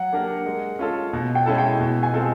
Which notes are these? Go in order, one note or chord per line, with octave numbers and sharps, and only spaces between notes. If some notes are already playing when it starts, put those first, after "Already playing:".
Already playing: F#3 F#5
A#3 D4 G4 A#4
G#3
C#4 F4 A4
B2
G5
G#3 C#4 E4 A4
G5
B2
G#5
G#3 C4 F4 A4